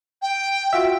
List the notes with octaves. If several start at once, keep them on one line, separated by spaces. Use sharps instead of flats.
G5
F4 F#4 E5